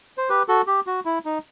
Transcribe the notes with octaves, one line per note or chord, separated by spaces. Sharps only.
C5
G4 B4
F#4 A4
G4
F#4
E4
D#4